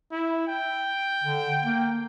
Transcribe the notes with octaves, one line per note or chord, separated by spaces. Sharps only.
E4
G5
D3
A#3